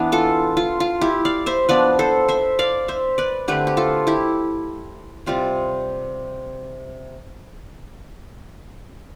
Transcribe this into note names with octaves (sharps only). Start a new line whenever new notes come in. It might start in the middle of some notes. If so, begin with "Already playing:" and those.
Already playing: E3 B3 D4
F4 A4
F4
F4
E4 G4
D5 F5
C5 E5
F3 B3 D4 B4 D5
A4 C5
C5 E5
D5 F5
C5 E5
B4 D5
D3 A3 C4 G4 B4
G4
F4 A4
E4 G4
C3 G3 C4 F4